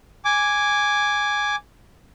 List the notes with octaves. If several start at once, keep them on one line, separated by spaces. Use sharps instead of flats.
G#5 D6